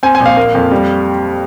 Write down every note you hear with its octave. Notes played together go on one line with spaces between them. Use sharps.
C4 G#5
G#5
A#1
F5
A#3
F2
G3